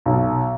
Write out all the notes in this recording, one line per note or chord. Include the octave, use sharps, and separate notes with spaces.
B1